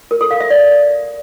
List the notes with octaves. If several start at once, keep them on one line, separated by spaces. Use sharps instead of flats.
A#4
A4
F5
E5
D5